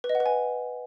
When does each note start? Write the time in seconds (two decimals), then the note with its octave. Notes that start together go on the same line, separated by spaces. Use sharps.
0.04 B4
0.09 D#5
0.15 F#5
0.20 B4
0.26 G#5